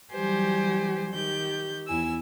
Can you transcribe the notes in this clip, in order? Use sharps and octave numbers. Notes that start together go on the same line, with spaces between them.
E3 F#3 G3 G4 C5 G#5
D#3 G4 G6
E2 E4 G#5 E6